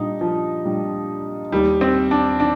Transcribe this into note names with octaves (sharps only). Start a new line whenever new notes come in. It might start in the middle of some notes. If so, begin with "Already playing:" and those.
Already playing: A#2 G3 D4 D#4
F3
A#2 G3 D4
D#2 D#3 G3 A#3 D#4
C4
D4
D#3 D4